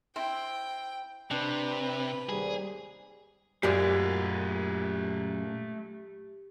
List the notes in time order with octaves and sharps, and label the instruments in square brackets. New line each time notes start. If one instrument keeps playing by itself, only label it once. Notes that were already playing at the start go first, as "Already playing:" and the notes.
[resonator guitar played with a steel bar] C4 E4 [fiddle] G5
[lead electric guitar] C3 [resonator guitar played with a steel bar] D4 [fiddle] B4
[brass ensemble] D#2 G#2 G3 [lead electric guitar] G#4
[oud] F#2 D5 [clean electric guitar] A#2 G#3 [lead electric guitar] A3 C5 [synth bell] G4